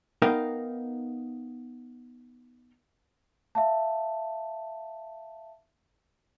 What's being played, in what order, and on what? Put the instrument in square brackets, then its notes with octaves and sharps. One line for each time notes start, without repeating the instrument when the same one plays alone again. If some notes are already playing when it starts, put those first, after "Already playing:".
[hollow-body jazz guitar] B3 D#4 A#4 F5 G5
[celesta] E5 F5 A5